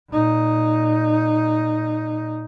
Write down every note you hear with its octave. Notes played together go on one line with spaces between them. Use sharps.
A#2 D#4